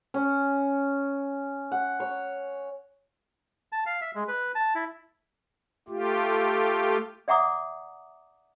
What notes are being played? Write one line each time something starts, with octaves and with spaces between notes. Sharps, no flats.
C#4
F#5
C#5
A5
F5
E5
G#3
B4
A5
E4
A3 F4 G4
D5 E5 F#5 A#5 D6 D#6